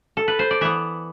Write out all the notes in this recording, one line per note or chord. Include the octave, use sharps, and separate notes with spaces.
A4
B4
C5
D5
E3 B3 E5